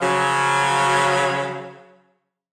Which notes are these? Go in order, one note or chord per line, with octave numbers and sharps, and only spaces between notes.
C#3 F3 F#3